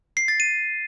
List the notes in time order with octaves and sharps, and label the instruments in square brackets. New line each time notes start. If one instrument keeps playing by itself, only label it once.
[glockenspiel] C7
A6
D#7